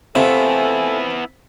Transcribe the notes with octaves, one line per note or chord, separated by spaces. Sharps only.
C3 A3 B3 E4 F4 A4 G#5